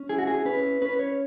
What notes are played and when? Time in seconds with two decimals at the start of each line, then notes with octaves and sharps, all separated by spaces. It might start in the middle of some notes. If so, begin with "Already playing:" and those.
Already playing: C#4
0.09 E4 G#4
0.18 F#4
0.27 G#4
0.45 C#4 B4
0.82 C#4 B4
0.99 C#5